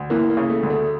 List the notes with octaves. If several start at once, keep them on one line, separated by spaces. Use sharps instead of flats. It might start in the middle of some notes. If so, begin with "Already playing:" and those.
Already playing: D2
E3 A#3
A#3
C#3
A3
D2
A3